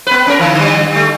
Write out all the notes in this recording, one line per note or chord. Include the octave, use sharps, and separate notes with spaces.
B3 B4
C#4 A#4
D3 E3
D3 G3
G3 A3